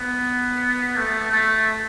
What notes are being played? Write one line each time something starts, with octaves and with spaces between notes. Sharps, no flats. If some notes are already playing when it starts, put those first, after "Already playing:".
Already playing: B3
A3
A3